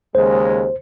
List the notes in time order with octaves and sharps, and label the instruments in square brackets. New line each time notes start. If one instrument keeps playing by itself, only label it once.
[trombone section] D#2 C#3 G#3 [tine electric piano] C5